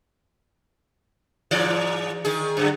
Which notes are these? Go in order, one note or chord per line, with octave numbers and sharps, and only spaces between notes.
G#2 E3 D5
D#3 G#4
F#2 D3